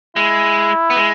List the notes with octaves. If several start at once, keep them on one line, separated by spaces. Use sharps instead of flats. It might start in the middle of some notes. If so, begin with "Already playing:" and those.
G#3 E4
B3
G#3